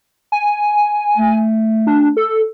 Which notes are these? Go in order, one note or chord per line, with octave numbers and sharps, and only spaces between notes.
G#5
A3
D4
A4